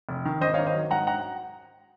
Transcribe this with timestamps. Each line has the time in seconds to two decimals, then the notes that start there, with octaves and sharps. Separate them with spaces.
0.09 F1
0.25 D#3
0.41 G#1 C5 D#5
0.54 C#5 F5
0.58 D#3
0.67 C5 D#5
0.75 F#3
0.91 G#2 F#5 A#5
1.07 F#5 A#5